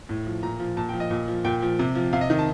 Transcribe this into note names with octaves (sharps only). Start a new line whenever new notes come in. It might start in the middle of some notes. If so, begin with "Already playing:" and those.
A2
F3
A#2 A#5
F3
A#2 A5
G5
F3
D#5
A#2
F3
A#2 G5
F3
C3
F3
C3 F5
D#5
D#3
A5